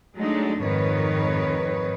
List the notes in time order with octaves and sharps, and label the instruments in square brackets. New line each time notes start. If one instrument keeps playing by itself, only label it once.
[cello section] F#3 G#3 A3 D4 D#4
F2 G#2 D#3 B4 C#5